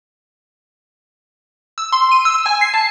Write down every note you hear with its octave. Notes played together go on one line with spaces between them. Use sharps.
E6
C6
D#7
E6
G#5
C7
A5